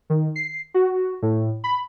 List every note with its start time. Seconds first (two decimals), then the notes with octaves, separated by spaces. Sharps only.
0.10 D#3
0.36 C7
0.74 F#4
1.22 A2
1.64 B5